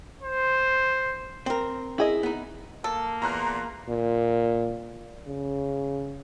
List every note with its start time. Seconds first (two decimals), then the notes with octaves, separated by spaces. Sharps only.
0.22 C5
1.46 C4 A#4
1.98 E4 G#4 D#5
2.23 B3 D#4
2.84 A#3 A4
3.22 E2 A#2 A#5 C6 F#6
3.89 A#2
5.27 C#3